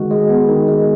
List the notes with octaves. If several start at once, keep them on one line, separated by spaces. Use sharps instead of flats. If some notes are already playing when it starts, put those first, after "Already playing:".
Already playing: D#3 G#3 F#4
G#3
B3
D#3
G#3